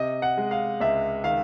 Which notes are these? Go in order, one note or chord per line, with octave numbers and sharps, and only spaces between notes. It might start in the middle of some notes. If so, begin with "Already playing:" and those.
Already playing: C3 D#5
F#5
G#3
F5
C#2 E5
D#3 F5